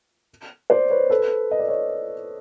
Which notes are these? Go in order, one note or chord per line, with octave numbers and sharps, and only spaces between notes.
C5 D5
B4 C#5
A4 B4
D#5
D5
C#5 D#5